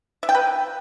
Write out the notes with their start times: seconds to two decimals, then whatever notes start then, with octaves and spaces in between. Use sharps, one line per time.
0.23 E5
0.29 G5
0.35 B4